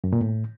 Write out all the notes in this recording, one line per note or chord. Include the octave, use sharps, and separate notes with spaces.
F#2
A#2
A2